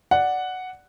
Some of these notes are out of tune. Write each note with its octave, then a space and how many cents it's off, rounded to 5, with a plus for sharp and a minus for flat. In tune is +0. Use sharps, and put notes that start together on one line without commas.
D5 +0 F#5 +0